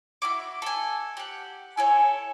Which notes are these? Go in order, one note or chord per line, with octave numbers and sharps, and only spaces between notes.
E4 F#4 D6
A4 G#5
G4 F#5
E4 A4 C#5 G#5